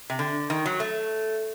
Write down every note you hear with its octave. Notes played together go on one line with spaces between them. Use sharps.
C3
D3
D#3
F#3
A3